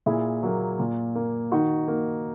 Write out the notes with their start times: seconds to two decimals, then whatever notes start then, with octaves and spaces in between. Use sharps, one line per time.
0.06 A#2 E4 G#4
0.43 F#3 A#3
0.79 A#2
1.15 A#3
1.52 D#3 D#4 F#4
1.88 A#3